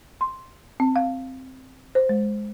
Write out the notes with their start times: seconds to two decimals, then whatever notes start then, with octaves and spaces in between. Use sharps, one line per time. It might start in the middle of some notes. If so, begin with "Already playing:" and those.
0.21 C6
0.80 C4
0.96 F5
1.95 C5
2.09 G#3